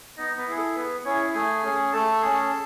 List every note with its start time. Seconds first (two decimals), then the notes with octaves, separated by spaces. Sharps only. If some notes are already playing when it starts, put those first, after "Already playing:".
0.17 B3 D#4 D#5
0.37 B3 B4
0.47 E4 G#4
0.57 A4
0.75 B3 B4
1.05 C#4 E4 G#4 C#5
1.34 A3 G#4 G#5
1.63 C#4 G#4
1.92 A3 A4 A5
2.21 C#4 G#4